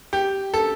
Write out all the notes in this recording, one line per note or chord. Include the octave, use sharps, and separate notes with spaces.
G4
A4